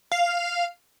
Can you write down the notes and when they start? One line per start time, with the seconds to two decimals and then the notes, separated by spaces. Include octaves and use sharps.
0.12 F5